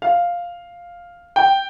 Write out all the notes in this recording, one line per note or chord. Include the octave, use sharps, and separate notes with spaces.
F5
G5